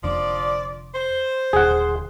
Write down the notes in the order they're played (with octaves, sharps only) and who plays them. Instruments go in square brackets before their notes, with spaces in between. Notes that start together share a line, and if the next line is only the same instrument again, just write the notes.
[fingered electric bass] F1 F2 D3 [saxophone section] F3 D5
[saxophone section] C5
[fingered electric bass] D#1 D3 [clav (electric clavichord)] G#4 F#5